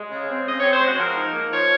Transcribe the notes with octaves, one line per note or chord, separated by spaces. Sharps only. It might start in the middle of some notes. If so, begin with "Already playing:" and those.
Already playing: G#3
C#3
C4
C#3 D#5
C#5
C4
C5
G#3 F#4
F3 A#4
D#4
A#3
F3 C#5